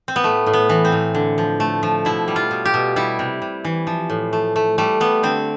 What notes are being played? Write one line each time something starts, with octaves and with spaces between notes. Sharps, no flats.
C4
B3
A2 A3
A2
B3
E3
C4
A2
D3
F3
A3
F3
B2 E4
G3
F4
B2
G4
B2
G3 E4
C3
C3
E3
F3
A2
A3
A3
G3 A3
G3 B3
D3 C4